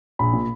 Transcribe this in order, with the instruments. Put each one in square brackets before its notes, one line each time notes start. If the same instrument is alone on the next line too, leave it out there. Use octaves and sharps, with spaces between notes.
[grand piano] A#1 B5
A#2